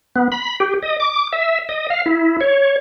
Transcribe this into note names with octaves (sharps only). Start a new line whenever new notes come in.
B3
B5
G4
D#5
D6
E5
D#5
F5
E4
C#5